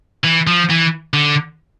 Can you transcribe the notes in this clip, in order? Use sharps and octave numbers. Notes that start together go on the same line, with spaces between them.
E3
F3
E3
D3